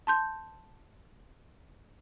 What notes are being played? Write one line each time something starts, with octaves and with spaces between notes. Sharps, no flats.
A5 C6 G6